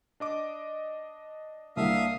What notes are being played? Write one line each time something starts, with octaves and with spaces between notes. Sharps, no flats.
D4 D#5 D6
C2 D3 A#3 E5 F5 D#6